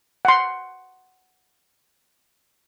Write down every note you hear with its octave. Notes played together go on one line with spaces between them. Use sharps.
F#5 C6